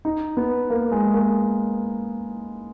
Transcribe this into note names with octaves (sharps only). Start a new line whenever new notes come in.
D#4
B3
A#3
G#3
A#3